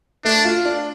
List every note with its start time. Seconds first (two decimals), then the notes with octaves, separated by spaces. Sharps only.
0.25 A3 D4
0.44 F4
0.65 D4